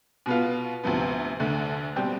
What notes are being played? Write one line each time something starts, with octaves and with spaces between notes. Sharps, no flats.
B2 B3 F4
D2 C3 F3 B3
D2 D3 A3
B2 G3 C4 G4